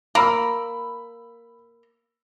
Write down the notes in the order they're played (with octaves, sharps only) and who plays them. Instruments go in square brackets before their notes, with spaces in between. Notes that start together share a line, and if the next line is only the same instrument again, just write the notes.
[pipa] A#3 [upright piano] B5 E6